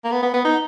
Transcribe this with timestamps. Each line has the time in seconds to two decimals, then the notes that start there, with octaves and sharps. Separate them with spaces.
0.04 A#3
0.12 B3
0.23 B3
0.34 B3
0.45 D#4